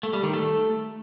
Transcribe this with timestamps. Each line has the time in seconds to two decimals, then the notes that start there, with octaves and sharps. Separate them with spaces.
0.03 A3
0.13 G3
0.23 D#3
0.33 A3